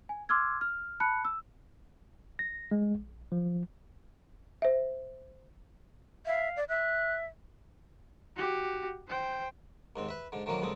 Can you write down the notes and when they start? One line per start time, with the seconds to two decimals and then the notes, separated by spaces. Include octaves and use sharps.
0.09 G#5
0.29 C6 D6 E6 F6 G#6
0.61 F6
1.00 A5 B5 F#6 C#7
1.25 E6
2.39 A#6
2.71 G#3
2.95 A#1
3.32 F3
4.62 C5 E5
6.26 E5 F5
6.56 D5
6.69 E5 F#6
8.36 F#4 G4
9.08 C5 G5
9.96 D#2 G#2 C4
10.08 B4 E5
10.32 G#2 D3
10.46 D3 D#3 F3 F#3 A#3
10.62 C#2 G2 A#2 D3 C4 D#6